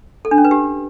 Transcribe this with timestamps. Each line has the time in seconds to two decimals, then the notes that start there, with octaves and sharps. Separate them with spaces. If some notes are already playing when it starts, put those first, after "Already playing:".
0.25 A4
0.31 D4
0.38 C#4
0.45 B4
0.51 G4